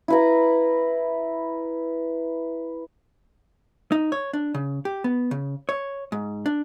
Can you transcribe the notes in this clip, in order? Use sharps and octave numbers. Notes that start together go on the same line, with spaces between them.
E4 B4 A#5
D#4
C#5
D4
C#3
G4
B3
C#3
C#5
G#2
D4